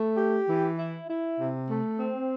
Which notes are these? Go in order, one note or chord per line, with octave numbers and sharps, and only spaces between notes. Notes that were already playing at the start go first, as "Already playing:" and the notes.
Already playing: A3
G4
E3
E4
E4
C3
A3
C4